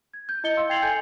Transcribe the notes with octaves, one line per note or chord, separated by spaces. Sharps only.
G#6
G6
E4 D#5 C#7 G7
F5 C6 E6
G5 G#6 A6 C7 F7 F#7
A4 G#5 G6 C#7